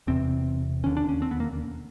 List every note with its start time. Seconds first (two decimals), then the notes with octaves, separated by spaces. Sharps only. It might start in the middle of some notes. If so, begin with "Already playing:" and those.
0.07 E1 E2 C3 C4
0.83 E1 D#2 D3 C#4
0.97 D4
1.09 C#4
1.22 C4
1.31 B3
1.40 A#3